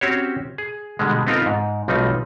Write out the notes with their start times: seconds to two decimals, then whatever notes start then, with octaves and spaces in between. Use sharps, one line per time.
0.01 C4 C#4 F#4 G4 C5 C#5
0.58 G#4
0.99 B2 D3 G3 G#3
1.27 B3 C4 D#4 F4 A4 A#4
1.46 G#2
1.88 B1 F3 G3 A3 C4 D#4